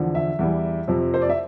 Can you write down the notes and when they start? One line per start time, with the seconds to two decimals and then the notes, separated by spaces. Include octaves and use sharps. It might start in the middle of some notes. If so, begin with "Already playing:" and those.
Already playing: E2 D3 F3
0.15 E5
0.39 E2 E3 G3
0.88 F2 C3 F3
1.14 C5
1.22 D5
1.29 E5